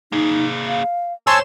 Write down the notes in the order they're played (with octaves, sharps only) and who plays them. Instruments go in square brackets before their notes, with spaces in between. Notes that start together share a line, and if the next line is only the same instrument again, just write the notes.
[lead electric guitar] A#3 G#4 [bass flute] D#4
[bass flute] F5
[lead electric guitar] B1 C5 [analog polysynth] C#5 C6 E7 [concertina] G#5 A5 E6